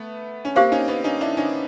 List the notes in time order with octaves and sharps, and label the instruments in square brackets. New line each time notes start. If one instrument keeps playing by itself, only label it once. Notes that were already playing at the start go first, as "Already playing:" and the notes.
Already playing: [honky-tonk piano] A3 B3
C#4
[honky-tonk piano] A#3 C4 [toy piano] G4 C5 F5
[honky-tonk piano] C#4 D#4
B3 C#4
C#4 D#4
D4 E4
C#4 D#4